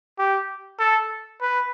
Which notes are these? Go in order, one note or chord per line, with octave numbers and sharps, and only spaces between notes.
G4
A4
B4